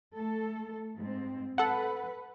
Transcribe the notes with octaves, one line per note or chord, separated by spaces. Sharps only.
A3 A4
G#2 C4
A4 B4 F#5